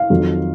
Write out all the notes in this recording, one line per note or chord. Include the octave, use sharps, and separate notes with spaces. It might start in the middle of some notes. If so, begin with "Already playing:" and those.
Already playing: F5
F2 D#3 F#3